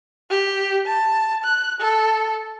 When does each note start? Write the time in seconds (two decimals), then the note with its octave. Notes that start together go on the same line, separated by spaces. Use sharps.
0.30 G4
0.86 A5
1.44 F#6
1.80 A4